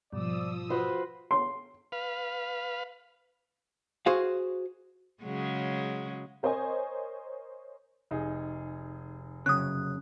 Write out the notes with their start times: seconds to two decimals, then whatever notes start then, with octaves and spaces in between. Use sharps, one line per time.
0.13 G#2 B2 F3 G3 D5 D#6 E6
0.70 F4 F#4 B4 C5
1.31 C6
1.92 B4 F5
4.06 F#4 G#4 C5 F5
5.23 C#3 F#3 G#3
6.43 A#4 C5 C#5 D#5 G#5
8.11 F1 D#4 G#4
9.46 F#2 C#3 D#6 F#6